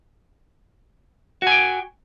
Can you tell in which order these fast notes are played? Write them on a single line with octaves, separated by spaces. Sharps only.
F#4 G#5 G5